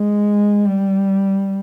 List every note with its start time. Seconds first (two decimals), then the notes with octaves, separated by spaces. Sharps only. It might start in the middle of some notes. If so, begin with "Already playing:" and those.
Already playing: G#3
0.65 G3